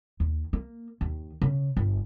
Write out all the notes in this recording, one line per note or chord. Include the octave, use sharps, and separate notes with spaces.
D#2
A#3
D#2
C#3
G1